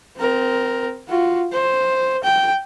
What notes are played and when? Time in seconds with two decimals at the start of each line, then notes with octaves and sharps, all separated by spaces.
0.17 C4 A#4
1.08 F4 F#4
1.53 C5
2.24 G5